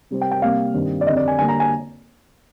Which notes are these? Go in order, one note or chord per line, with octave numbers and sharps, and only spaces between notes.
C3 G3 C4
G5
G5
C3 G3 A#3 F5
G2 D#3 G3 C4
D5
F2 D3 G3 D#5
D5
G#5
D3 G3 A#3 G#5
A#5
G#5